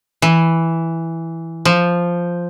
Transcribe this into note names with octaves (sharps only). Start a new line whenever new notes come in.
E3
F3